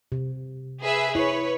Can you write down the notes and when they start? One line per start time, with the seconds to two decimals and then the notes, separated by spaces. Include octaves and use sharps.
0.12 C3
0.81 G#4 B4 E5
1.15 E4 B4 C#5